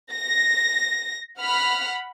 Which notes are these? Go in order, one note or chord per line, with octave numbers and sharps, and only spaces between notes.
A#6
F#5 B5 F6